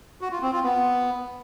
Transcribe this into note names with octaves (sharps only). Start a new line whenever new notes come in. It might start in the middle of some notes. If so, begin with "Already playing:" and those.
F#4
F4
C4
F4
B3